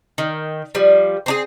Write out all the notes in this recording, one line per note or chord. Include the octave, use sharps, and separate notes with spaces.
D#3
F3 G3
C4 D4 G#4